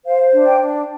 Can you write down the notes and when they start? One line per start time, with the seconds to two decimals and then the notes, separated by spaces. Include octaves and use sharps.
0.05 C5 F5
0.32 D4
0.46 G5
0.59 D4